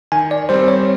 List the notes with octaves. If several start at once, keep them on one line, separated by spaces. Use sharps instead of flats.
D#3 G#5
D5
G3 C4 C5
C#5